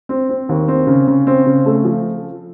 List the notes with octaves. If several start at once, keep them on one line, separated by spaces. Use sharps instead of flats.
C4
C4
D#2
C4
C#3
C#3
C4
C#3
A3
F3